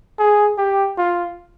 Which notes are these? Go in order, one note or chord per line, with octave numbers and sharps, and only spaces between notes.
G#4
G4
F4